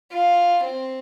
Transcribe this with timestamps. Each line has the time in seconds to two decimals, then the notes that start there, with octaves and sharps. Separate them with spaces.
0.13 F4
0.65 C4